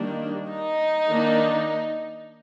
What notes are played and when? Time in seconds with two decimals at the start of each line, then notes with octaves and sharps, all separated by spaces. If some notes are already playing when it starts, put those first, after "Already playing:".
Already playing: D#3 G3 A#3 D4
0.48 D#4
1.09 D#3 A#3 D4